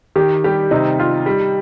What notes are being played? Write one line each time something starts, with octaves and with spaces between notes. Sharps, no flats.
D#3 G4
G3 G4
C3 D#4
F4
G3